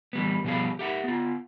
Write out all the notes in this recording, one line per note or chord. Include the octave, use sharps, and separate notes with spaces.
E3 G3 B3
B2 F3 G3 B3 G#4 F5
G4 E5 F#5
B3 F4